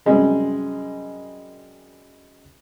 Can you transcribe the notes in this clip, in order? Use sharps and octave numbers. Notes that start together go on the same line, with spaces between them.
F#2 C3 G3 G#3 A#3